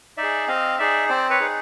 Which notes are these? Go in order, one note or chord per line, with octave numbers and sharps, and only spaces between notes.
D#4 D5 E5
G#4
C4 D#5 F5
D#4 G#4 D5 E5
C4 C5 D5
B4 C#5
D#4 G#4